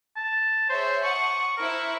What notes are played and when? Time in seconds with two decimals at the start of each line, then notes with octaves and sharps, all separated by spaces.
0.17 A5
0.70 G#4 C5 C#5 E5
1.04 F#5 A5 C#6 D#6
1.57 E4 A#4 C5 C#6